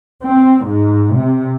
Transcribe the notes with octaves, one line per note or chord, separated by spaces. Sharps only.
C4
G#2
C3